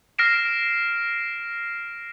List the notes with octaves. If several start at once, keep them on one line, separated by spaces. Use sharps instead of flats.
F6 A#6 C7 D7 E7